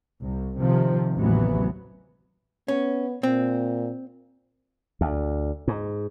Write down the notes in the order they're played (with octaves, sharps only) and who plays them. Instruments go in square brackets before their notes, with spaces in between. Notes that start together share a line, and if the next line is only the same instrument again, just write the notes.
[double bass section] C2
C3 D#3 F3
A1 D#2 C3 E3 F#3 B3
[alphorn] B3 [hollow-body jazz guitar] C#4
[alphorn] A#2 [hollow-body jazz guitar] C4
[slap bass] D2
G#2